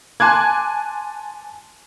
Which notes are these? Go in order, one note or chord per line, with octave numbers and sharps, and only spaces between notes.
G#5 A5 C6 D6 F#6 G#6